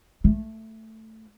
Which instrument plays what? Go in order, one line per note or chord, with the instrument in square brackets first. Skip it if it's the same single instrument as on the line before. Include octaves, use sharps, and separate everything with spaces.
[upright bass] A3